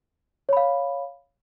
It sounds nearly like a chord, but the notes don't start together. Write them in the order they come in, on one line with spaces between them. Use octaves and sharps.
C#5 B5 F5